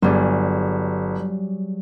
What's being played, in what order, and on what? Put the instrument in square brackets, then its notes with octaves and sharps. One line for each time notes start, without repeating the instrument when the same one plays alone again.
[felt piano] G1 [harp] F#3 G3 G#4